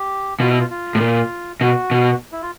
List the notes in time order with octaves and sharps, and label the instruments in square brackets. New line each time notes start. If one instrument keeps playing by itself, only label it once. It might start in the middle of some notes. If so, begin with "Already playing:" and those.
Already playing: [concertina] G4
[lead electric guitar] B2 [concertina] F4
[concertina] E4
F4
F4
[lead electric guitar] A2
A#2
[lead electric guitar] B2 [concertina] F#4
[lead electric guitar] B2
[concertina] E4
F4